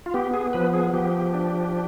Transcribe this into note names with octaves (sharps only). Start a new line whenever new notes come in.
F4
B3 G4
G#4
F3 B4
G#4
F3 G4
D4
D4